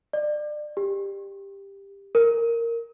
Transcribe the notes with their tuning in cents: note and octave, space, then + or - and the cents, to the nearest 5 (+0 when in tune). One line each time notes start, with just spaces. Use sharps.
D5 +30
G4 +10
A#4 -10